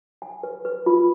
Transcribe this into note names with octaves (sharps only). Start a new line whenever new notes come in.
G#5
B4
B4
F4